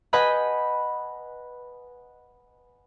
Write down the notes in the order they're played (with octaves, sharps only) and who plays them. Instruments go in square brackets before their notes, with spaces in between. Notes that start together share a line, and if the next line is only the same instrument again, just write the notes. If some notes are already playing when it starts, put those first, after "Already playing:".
[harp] B4 D#5 F#5 G#5 B5 G6